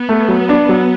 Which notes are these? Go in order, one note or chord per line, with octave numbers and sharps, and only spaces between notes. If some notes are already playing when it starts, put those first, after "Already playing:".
Already playing: B3
A3
F#3
D4
F#3